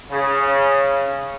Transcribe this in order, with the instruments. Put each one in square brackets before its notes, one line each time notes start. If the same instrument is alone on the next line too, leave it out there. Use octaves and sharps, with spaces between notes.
[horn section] C#3